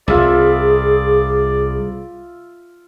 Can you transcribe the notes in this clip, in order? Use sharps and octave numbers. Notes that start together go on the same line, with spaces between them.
C2 F4 G#4 D5 E5